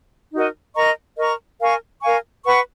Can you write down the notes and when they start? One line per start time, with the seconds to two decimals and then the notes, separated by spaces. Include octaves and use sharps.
0.32 D#4 F#4 A#4 D#5
0.75 A#4 D#5 A#5 C#6
1.17 A#4 D#5 A#5 C#6
1.60 A#4 F5 G#5 C#6
2.01 A#4 F5 G#5 C#6
2.44 B4 F#5 C#6